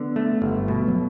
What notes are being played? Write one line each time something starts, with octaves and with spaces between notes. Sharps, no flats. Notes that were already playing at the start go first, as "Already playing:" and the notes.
Already playing: D3 B3
A3
G1
B2 A3
F#3